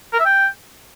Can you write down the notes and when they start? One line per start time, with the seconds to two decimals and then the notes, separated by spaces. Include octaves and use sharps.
0.13 A#4
0.19 E5
0.26 G5